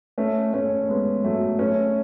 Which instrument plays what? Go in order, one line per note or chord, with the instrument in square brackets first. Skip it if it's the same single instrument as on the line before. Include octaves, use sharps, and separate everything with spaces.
[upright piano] A3 C#4
A3 C#4
G#3 B3
F#3 A3
A3 C#4